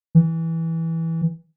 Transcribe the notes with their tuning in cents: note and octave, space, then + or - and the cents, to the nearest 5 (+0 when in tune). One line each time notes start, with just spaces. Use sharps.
E3 -10